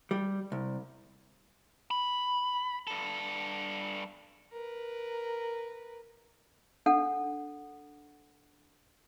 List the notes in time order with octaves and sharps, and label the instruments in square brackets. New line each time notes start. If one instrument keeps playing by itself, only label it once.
[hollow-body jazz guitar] G3
C2
[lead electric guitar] B5
G2 A4
[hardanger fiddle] A#4 B4
[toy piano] D4 A4 F#5